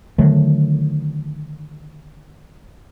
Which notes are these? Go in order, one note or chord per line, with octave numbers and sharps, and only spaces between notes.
D3 D#3 F#3 A3